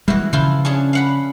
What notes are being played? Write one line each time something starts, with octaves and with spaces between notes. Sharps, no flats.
E3 G3 G#3 F#4
C#3 F3 E4 F4
C#4 D4 G#4
F5 F#5 B5